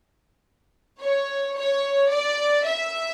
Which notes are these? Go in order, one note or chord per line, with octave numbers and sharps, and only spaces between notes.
C#5
C#5
D5
E5